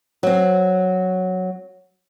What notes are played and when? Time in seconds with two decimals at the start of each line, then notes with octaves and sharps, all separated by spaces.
0.23 F#3 C4